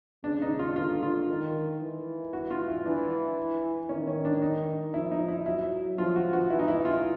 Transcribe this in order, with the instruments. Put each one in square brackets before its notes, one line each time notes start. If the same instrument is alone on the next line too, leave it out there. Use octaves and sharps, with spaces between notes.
[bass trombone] C#3 [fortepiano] D4
[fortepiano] D#4
F4
[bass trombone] D3 [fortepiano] F4
[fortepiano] F4
[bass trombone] D#3
E3
[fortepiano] F#4
F4
E4
[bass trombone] E3 [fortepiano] D4
[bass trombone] D#3 [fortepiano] C#4
[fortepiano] C#4
D4
D#4
[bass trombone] F3 [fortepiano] E4
[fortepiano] D#4
E4
[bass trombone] F#3 [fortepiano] E4
[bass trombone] F3 [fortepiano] F4
[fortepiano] F#4
F#4
[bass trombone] E3 [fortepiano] E4
[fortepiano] D#4
E4
F4